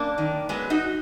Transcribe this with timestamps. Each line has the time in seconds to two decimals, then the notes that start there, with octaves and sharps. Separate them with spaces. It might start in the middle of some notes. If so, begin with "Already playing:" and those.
Already playing: F#2 A#3 D4
0.18 D#3
0.49 F#3 G#3 B3
0.70 D#4 F#4